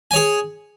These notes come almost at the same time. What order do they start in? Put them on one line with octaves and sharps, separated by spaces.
G#5 C#5 G#4